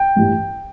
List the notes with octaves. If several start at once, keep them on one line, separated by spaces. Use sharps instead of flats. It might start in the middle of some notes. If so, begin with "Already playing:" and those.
Already playing: G5
A1 G2 E3 G3